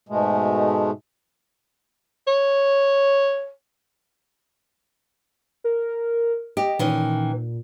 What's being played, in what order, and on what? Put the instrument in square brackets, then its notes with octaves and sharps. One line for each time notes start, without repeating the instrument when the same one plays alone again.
[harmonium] G#2 B2 G#3 A3
[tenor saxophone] C#5
[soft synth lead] A#4
[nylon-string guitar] G4 [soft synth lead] D#5
[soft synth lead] A#2 [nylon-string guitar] D#3 E3 C#4